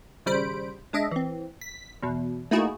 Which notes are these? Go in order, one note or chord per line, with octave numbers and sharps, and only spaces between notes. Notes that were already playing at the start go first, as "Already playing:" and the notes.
G#1 C#3 G3 C5 B5 D7
G#3 D4 D#5 E5
E3 C4
B6
E2 B2
A3 A#3 D#4 E4 F#4 G#4